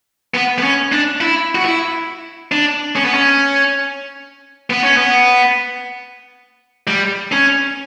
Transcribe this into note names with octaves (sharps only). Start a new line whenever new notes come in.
B3
B3
C#4
D4
E4
F#4
E4
D4
C#4
B3
C#4
B3
C#4
B3
G3
C#4